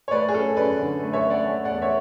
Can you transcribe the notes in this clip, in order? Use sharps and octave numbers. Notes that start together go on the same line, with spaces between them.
C#5
A3 B4 D5
G#4
C#4 A4
F#2 B4 D5
D3
A3
C#5 E5
C#4
D5 F#5
A3
D5 F#5
E2
C#5 E5